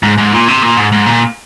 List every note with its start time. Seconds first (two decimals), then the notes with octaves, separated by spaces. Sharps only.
0.03 G#2
0.18 G#2
0.32 A#2
0.48 C3
0.62 A#2
0.77 G#2
0.92 G#2
1.06 A#2